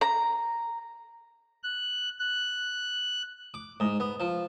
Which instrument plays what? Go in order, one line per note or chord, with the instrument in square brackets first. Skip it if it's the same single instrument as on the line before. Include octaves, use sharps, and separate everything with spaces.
[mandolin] A#5
[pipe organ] F#6
F#6
[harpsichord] D6
G#2
B3
F3